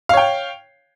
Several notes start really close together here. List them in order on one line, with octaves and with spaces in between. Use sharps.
F5 C#5 G5